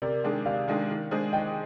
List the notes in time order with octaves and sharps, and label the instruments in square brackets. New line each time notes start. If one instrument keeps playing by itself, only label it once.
[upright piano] C3 [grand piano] A#4 D5
[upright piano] D#3 G#3 D4 G#4
[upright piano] C3 [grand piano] D5 F5
[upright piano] D#3 G#3 D4 G#4
D#3
G#3 D4 G#4 C5
[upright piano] D#3 [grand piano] D#5 G5